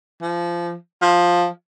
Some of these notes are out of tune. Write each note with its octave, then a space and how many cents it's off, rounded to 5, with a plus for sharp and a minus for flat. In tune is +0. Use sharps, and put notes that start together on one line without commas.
F3 -20
F3 +10